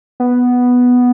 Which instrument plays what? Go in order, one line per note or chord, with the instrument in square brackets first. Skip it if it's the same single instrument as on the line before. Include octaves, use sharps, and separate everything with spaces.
[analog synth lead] B3